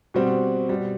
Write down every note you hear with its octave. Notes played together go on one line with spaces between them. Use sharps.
B2 G3 C4 F#4
B2 G3